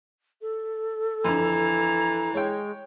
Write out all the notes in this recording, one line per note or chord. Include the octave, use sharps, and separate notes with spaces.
A4
F2 D3 E3 A#5
G#3 C#5 G5